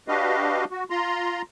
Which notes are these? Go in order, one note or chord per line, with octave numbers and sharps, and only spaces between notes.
D4 F#4 G4 B4 D#5 F5
F#4
F4 A#5 C6